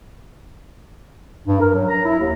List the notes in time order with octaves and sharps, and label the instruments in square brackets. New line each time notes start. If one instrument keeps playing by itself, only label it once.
[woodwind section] G2
A#4
F#3
A#5
E4
D#2